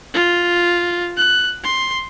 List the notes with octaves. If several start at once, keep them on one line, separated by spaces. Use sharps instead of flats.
F4
F#6
C6